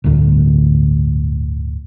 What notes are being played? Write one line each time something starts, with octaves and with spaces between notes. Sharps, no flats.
G1 D2 A2